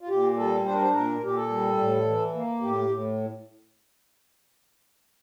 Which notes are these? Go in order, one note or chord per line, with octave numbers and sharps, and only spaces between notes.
F4
A#2 G4
G3 A4
D4 C5
A#4
C5
A#2 A#4
A#2 G4
A4
G3
A2
E3
A#3
A2 G4
A2